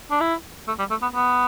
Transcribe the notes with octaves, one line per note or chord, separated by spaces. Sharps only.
D4
E4
A3
G3
A3
B3
B3